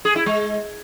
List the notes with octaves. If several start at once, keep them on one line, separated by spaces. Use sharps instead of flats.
G#4
E4
G#3